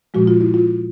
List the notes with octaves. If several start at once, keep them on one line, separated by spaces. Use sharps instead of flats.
A#2 F3 G#3 F#4
F4
E4
F4